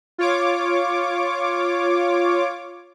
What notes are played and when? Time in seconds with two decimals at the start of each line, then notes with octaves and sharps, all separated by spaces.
0.18 F4 C#5 D6